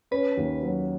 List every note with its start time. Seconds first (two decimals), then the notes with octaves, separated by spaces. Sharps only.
0.11 C#4 B4
0.37 D#2
0.63 F#3